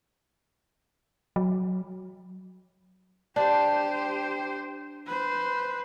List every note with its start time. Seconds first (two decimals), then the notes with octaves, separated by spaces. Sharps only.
1.36 F#3
3.36 D4 G4 C5
5.07 B4 C5